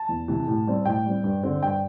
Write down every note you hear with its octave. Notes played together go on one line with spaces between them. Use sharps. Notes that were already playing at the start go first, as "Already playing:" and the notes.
Already playing: A5
E2
C3 E3
A2
G3 C4
A2 G5
G3 C4
G2
D3 C4
G2 G5